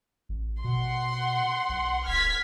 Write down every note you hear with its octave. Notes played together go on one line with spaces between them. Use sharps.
A1
B2 F#5 C6
B1
D1 F6 G#6 B6